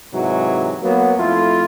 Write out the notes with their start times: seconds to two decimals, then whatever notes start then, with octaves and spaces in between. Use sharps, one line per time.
0.13 G#2 C3 E3 F#3
0.82 F#3 A#3 B3
1.17 F2 A3 E4 F4